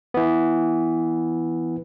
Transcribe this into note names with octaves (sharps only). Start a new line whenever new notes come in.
E3 B3